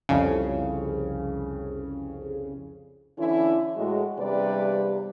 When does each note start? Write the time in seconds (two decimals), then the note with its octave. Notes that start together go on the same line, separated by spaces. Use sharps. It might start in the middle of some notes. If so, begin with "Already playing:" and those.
0.09 C2 F2 C#3
3.18 D3 E3 C#4 E4
3.77 A2 G#3 F#4
4.18 E2 G2 C3 G3 B4 D5